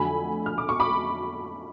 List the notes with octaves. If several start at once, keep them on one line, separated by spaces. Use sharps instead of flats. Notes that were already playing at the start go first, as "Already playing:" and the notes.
Already playing: F2 D3 F#3 A3 G#5 B5
F6
D6
C#6
B5 D6